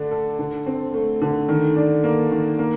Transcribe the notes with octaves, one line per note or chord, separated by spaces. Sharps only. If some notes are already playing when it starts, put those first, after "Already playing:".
Already playing: D3 A3 D4
A4
D3
C4
A3
D3
D#3
D4
A#3
D#3
A#3